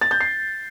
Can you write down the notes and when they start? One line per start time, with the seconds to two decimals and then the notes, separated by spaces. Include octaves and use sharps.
0.01 A6
0.11 G6
0.20 C7